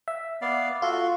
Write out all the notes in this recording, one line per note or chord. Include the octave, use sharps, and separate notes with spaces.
E5
B3 D5 F5
F4 F#4 A4 C6